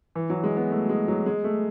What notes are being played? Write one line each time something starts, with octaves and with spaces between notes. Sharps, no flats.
E3
F#3
G#3
B3
A3
G#3
F#3
G#3
A3